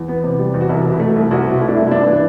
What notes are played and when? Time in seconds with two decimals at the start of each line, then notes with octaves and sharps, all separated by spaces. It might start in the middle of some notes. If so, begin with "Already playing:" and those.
Already playing: E2
0.08 B3
0.24 C3
0.39 G3
0.54 E2
0.61 F#4
0.69 C2 E4
0.84 B2
1.00 A3
1.15 C2
1.31 C2 F#4
1.45 B2
1.61 A3 E4
1.68 D4
1.76 C2 E4
1.87 E4
1.91 G2 D4
2.07 E3